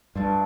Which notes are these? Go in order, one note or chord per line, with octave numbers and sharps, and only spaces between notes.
G2 A3 D4 F4